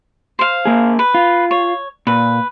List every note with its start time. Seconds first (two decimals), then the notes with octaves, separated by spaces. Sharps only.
0.39 C5 F5
0.65 A#3 G#4
0.99 B4
1.14 F4
1.51 C#5
2.07 A#2 B4